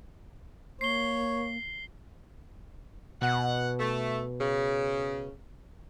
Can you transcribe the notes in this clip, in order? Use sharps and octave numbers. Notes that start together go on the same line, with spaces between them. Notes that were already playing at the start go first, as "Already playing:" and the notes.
A#3 C#5 C7 G7
B2 F#5
A3
C#3